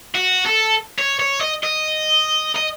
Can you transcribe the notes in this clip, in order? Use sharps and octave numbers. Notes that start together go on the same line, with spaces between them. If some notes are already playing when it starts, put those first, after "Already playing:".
F#4
A4
C#5
C#5
D#5
D#5
D#5